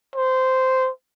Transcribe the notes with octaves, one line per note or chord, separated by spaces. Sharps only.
C5